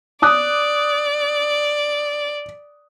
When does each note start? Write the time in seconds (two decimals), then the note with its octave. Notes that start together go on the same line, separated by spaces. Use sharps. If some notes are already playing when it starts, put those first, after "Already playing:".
0.22 D5 D6 D#6 F#6